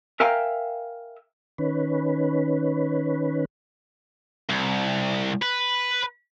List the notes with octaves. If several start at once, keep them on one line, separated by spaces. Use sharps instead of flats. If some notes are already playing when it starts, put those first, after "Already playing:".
A#4 E5 F5 G5 G#5 A#5
D#3 C#4 B4
C2
B4